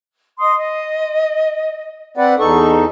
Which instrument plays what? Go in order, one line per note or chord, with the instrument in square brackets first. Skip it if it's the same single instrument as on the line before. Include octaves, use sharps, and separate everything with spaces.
[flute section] D#5 C6 D#6
D#5
[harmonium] C4 B4 D5 [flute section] F#5
[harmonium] E2 D#4 A4 [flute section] C#6